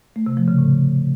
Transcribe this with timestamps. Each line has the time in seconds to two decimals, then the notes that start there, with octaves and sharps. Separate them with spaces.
0.16 A3
0.26 C3
0.37 F3
0.48 C#3
0.58 A2